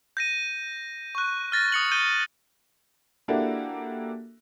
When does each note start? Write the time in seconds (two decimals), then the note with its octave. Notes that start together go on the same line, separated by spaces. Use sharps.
0.17 G6 A#6 D#7
1.15 C#6 F#6
1.52 F6 A6 A#6
1.72 D#6 C#7 F#7
1.91 G6 D#7 G7
3.28 A#3 D4 E4 F#4 G4 A4